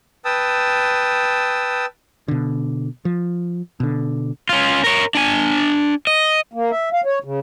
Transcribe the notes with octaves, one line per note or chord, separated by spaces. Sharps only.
B4 G5 A5 D#6 E6
B2 D3
F3
B2 D3
C#4 F4
A#4 C#5
D4 G#5
D#5
A#3
E5
F5
C#5
C#3